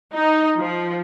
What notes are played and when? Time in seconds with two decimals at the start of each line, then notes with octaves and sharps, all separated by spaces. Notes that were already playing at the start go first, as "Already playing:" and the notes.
0.13 D#4
0.59 F3